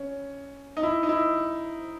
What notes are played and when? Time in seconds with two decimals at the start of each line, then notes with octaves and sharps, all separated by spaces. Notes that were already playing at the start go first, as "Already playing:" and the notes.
Already playing: C#4
0.77 D#4
0.83 E4
1.03 D#4
1.09 E4